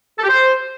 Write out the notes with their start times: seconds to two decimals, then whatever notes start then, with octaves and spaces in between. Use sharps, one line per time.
0.18 A4
0.23 G4
0.28 C5